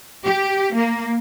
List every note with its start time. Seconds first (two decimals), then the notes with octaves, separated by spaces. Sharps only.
0.24 G4
0.74 A#3